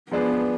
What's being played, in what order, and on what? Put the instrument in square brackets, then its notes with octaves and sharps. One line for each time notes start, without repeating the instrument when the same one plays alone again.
[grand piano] F3 G#3 D4 G#4 B4 [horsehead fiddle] B3